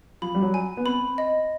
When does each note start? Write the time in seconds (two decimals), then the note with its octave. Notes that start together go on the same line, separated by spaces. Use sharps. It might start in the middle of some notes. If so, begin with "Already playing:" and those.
0.22 F3 B5
0.35 G3
0.42 F#3
0.54 G#5
0.77 B3
0.85 C4 B5
1.18 D#5